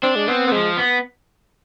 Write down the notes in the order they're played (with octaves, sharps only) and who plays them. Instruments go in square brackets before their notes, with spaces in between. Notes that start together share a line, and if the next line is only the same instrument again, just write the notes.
[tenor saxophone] C4 [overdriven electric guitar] D4
[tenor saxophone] G#3
[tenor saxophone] B3 [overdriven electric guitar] C4
[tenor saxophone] B3
[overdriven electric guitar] F3 [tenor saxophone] G#3
[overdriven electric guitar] B3